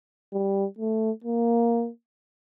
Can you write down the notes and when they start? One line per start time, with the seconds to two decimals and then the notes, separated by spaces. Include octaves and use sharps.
0.33 G3
0.79 A3
1.24 A#3